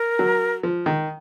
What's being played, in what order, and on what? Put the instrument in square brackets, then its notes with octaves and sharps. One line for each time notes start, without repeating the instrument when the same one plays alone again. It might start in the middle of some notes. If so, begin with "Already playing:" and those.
Already playing: [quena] A#4
[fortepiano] F#3
F3
D#3